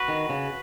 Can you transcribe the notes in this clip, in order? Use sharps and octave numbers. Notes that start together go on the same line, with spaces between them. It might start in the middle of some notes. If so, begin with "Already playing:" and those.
Already playing: F#4 B4
D#3
C#3